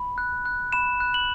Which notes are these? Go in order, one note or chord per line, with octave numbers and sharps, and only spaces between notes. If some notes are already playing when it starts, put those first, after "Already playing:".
Already playing: B5
F#6
F#6
B5 E7
F#6
F#7